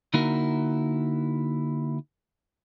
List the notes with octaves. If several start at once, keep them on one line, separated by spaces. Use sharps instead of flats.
D3 A#3 D#4 E4 F#4 A#4